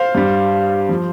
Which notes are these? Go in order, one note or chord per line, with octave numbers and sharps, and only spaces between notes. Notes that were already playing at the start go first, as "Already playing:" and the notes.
Already playing: C5 F5
G2 G3
F3